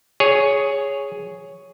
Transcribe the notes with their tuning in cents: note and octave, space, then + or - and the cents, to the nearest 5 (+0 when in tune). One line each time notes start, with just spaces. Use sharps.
G#4 +0 C#5 +5